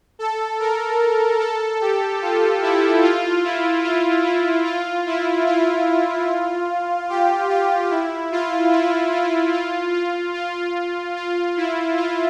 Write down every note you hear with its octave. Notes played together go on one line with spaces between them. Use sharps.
A4
A#4
A4
G4
F4
E4
F4
E4
F4
E4
F4
E4
F4
G4
F4
E4
F4
E4
F4
F4
F4
F4
F4
E4
F4